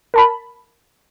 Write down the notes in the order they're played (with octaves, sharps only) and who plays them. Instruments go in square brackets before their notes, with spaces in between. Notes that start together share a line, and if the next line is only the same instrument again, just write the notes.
[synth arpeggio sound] A#4 A5 B5